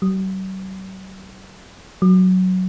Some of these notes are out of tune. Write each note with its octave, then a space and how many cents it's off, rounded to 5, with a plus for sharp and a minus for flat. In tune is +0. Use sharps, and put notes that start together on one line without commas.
F#3 +45
F#3 +0